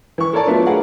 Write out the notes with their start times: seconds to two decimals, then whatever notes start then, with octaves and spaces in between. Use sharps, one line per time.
0.18 E3 C#6
0.33 A4 A#4 C#5 D5 A5
0.47 F#3 A3 B3 D4 F4
0.66 G#4 A#4 B4 F5 F#5